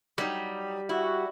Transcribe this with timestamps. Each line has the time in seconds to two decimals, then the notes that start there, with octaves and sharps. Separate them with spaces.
0.18 F#3 G3 D#4
0.89 E4 F#4